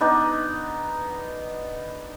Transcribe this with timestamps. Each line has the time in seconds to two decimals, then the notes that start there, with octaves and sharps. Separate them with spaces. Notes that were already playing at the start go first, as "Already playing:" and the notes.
0.01 B3 D4 D#4 D#5